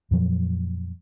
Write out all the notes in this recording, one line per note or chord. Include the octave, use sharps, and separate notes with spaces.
F2 A#2 F3 F#3